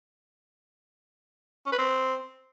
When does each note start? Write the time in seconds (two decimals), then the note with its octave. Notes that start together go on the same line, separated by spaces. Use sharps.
1.66 C#4
1.72 B4
1.79 C4